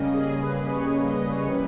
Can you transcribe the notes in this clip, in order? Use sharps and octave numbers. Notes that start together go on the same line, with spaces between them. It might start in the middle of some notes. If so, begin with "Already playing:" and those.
Already playing: C#3 G3 A#3 C#4 D#5
G#4
B4
D#5
C#5
D#5
C#5
E3 G3 A#3 C#4 B4